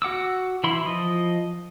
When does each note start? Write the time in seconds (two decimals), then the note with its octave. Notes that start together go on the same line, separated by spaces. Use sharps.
0.02 F#4 F#5 D6 E6
0.64 E3 E4 B5 C6
0.86 F3 D#5